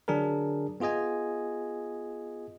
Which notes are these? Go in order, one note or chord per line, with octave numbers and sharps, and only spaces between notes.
D3 F#3 D4 G#4 A#4
B3 F4 G#4 D#5 G#5